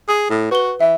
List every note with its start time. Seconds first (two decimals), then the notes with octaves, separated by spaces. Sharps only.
0.09 G#4 D#6
0.30 A2
0.51 F#4 B4 G7
0.81 E3 E5